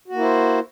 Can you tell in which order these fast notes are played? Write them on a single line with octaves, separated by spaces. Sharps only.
F#4 A#3 E4 C5